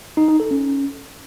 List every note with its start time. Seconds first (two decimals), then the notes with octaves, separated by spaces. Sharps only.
0.17 D#4
0.28 D#4
0.40 A4
0.51 C#4